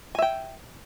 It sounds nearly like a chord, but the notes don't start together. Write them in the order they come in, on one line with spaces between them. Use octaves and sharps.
G#5 E5 G5